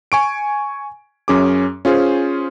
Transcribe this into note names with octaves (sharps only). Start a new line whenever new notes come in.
G#5 C#6 D7
F#2 C#4 G#4 D6
C#4 F4 G#4 C5